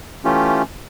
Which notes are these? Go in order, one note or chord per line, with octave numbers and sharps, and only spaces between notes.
E3 A3 C#4 F4 G4